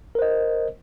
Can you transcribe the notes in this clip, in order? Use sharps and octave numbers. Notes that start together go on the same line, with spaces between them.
A#4 C5 D#5